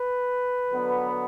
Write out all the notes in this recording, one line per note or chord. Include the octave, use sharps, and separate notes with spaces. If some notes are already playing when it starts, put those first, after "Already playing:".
Already playing: B4
D3 F#3 B3